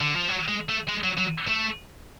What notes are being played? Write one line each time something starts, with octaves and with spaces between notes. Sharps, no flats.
D3
F3
F#3
G#3
A3
G#3
F#3
F#3
A3